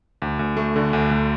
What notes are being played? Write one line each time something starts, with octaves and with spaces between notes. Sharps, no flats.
D2
D2
A3
D3
D2
D2